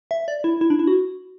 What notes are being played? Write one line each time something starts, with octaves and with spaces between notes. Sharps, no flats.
E5
D5
E4
E4
D4
E4
F#4